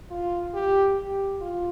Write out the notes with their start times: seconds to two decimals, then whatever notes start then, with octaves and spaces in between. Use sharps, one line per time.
0.11 F4
0.54 G4
0.98 G4
1.41 F4